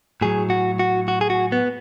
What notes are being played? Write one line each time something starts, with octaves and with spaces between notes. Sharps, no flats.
A2 F#3 G#4
F#4
F#4
F#4
G#4
F#4
B3